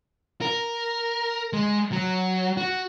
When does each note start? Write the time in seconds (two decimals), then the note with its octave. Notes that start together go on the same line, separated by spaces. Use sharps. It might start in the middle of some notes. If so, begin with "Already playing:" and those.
0.41 A#4
1.53 G#3
1.92 F#3
2.57 F#4